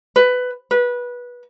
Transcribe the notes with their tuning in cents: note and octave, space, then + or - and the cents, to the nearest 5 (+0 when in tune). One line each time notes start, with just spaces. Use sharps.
B4 +15
B4 -20